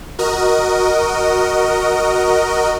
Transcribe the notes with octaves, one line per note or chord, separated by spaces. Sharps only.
F#4 A#4 D#5